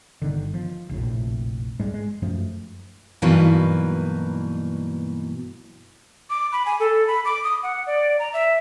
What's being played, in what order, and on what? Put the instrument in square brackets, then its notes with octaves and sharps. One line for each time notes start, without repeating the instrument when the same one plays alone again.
[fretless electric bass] G1 D3 D#3
F3
F1 A#1 A2
G#2 G3 G#3
G#3
F#2 F3 A3
[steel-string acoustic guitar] G2 B2 E3 F#3 A#3 D#4
[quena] D6
B5
G#5
A4
B5
D6
D#6
F#5
D5
A#5
E5